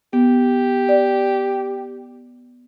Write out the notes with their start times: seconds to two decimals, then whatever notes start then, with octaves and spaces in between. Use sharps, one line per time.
0.13 B3 G4
0.89 D5